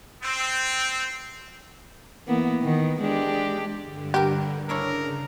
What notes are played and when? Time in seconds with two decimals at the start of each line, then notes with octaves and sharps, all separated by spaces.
0.22 C4
2.27 E3 A#3 B3
2.62 D#3 B3
3.01 G#3 D4 G4
3.82 G2 D3
4.14 G4 A#4 B4
4.69 C#3 D4 E4 A#4 C#5